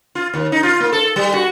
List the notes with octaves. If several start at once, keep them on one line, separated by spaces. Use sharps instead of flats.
F4
D#2
D#4
F4
A#3
A4
G3
F#4